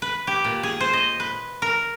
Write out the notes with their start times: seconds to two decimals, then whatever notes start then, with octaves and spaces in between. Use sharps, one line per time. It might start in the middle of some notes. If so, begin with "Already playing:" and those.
0.02 B4
0.27 G4
0.44 A#2
0.63 G#4
0.80 C5
0.93 D#5
1.20 B4
1.62 A#4